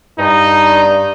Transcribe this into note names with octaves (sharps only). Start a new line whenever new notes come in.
G2 D#4